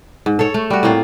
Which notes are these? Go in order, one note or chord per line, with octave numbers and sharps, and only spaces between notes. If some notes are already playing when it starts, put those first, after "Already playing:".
G#2
A4 C#5
A3
G3 F#4
A2 A#3 C4 F4